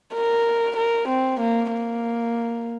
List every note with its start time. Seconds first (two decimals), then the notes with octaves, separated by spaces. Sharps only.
0.13 A#4
0.76 A#4
1.08 C4
1.40 A#3
1.72 A#3